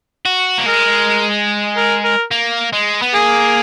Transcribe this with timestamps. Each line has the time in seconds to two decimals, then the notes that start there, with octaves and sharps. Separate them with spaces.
0.25 F#4
0.58 A#3
0.66 G#3 A#4
1.76 A#4
2.04 A#4
2.31 A#3
2.73 G#3
3.02 B3
3.14 A#3 G#4